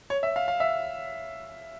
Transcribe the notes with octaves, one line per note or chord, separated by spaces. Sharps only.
C#5
E5
F5
F5
E5